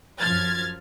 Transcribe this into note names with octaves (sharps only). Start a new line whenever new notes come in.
F#2 F3 F6 G#6 A6